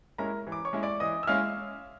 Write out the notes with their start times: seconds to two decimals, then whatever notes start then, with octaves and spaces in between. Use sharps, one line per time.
0.18 G#3 C#4 E4 A#4 A#5
0.47 E3
0.52 D6
0.65 C#5 C#6
0.73 G#3 C#4 E4
0.83 D5 D6
1.00 E3 D#5 D#6
1.23 E6
1.27 G#3 C#4 E4 F5 F6